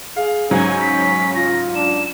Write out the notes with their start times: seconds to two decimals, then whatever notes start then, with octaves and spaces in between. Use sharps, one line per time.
0.16 G#4 F5
0.51 G#2 C#3 F#3 C#4 C5 G#5
0.81 B6
1.35 F4 A#6
1.75 D4 E7